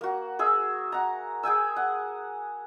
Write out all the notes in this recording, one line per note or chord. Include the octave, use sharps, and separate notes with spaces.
A#3 F#4
G#4 E5 E6
F#5 A#5
G#4 G5 G#5 E6
F#5